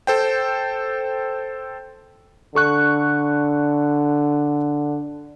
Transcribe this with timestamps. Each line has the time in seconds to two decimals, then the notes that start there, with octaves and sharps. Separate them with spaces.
0.07 A4 C5 G5
2.55 D3 A4 C#6 F#6